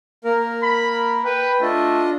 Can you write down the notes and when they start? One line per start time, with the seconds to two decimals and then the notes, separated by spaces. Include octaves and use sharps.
0.25 A#3 A#4
0.63 B5
1.25 B4 G5
1.61 A3 D4 F4 D#5